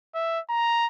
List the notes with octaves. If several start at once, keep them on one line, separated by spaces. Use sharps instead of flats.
E5
A#5